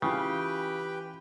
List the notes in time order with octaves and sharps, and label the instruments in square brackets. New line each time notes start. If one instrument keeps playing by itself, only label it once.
[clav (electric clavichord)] C#3 [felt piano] E3 C#4 F4 [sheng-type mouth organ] G4 B4 G5